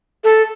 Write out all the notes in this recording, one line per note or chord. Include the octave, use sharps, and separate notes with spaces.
A4